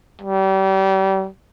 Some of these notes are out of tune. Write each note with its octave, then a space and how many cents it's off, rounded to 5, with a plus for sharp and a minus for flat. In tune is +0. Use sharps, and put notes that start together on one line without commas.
G3 -35